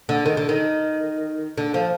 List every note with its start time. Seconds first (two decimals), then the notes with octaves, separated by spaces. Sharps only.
0.09 D3
0.26 D#3
0.37 D3
0.49 D#3
1.57 D3
1.74 F3